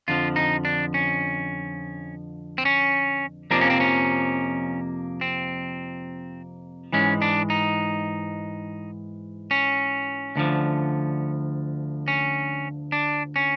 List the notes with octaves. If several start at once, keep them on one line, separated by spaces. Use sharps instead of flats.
F2 D3 F3 F4
D#4
D4
C#4
C4
C#4
F2 C3 F3 A#3 D4
C#4
C4
C#4
C4
G#2 E3 G#3 C#4
D4
D#4
C#4
D2 D3 F3
C#4
D4
C#4